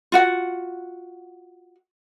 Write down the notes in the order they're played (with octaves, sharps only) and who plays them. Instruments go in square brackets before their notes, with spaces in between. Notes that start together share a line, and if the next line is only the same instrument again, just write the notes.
[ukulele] F4 F#4 F#5